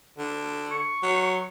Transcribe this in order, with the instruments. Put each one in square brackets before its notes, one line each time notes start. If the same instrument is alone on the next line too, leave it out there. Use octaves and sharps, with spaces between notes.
[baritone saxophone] D3
[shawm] C#6
[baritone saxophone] F#3